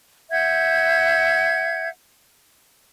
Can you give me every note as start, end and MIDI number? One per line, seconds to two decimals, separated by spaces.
0.31 1.89 76
0.31 1.89 78
0.31 1.89 91
0.31 1.89 92